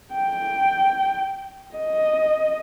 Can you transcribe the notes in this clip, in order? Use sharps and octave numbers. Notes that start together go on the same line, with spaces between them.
G5
D#5